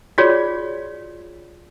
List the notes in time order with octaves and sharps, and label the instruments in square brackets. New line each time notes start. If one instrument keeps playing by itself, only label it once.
[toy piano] F4 F#4 G#4 C#5 D5